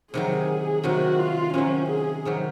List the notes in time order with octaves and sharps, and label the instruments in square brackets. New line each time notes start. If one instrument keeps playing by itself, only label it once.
[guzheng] C3 D#3 F#3 [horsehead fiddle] G#4
[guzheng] C3 D#3 F#3 [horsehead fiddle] F#4
[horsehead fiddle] F4
[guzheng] C3 D#3 F#3 [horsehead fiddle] C#4
[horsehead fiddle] G#4
[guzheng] C3 D#3 F#3